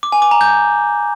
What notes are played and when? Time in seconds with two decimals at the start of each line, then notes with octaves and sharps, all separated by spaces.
0.03 D6
0.12 G#5
0.22 D6
0.31 A#5
0.41 G6